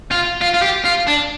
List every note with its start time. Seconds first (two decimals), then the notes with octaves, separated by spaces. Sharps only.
0.11 F4
0.41 F4
0.54 F4
0.62 G4
0.85 F4
1.07 D4